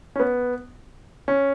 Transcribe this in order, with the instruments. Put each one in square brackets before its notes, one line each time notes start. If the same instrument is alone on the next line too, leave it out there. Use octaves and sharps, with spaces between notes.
[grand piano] C#4
B3
C#4